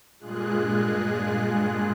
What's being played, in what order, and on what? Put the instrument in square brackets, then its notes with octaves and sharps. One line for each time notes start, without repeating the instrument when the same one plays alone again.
[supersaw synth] G2 A#2 G#3 F4 G#4 F#6